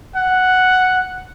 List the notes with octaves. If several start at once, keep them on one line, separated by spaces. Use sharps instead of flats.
F#5